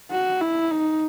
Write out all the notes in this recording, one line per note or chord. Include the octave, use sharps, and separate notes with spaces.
F#4
E4
D#4